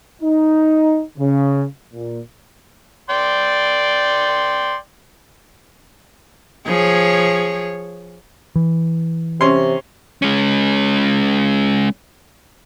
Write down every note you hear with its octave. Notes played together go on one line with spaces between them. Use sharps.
D#4
C#3
A#2
D5 G5 C6
F3 G#4 C#5
E3
C3 C#4 C6
G#3 C#4